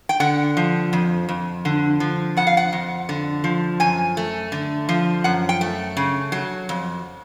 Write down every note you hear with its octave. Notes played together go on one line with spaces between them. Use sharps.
G5
D3 F#5
F3
F2
F2
D3
F3
F2 F#5
F5
F#5
F2
D3
F3
F#2 G#5
A3
D3
F3
F#2 F#5
G5
A3
C#3
F#3
F2